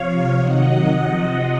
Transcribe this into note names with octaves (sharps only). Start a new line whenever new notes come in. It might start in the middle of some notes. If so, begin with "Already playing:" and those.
Already playing: C3 F3 C#5 F5
C3 D#3 F#3 D#5 F#5
C3 F3